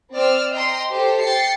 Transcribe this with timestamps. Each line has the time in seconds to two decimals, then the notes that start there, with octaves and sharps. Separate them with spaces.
0.13 C4 D5 E6 F6
0.53 D#5 G5 A#5 C6
0.90 G4 A4 C5
1.22 G5 A6 C7 C#7